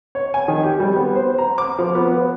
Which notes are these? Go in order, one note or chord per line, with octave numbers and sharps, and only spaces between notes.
C#5
G#5
D#3
G4
G3
B3
C5
A#5
D6
F3
B3
B3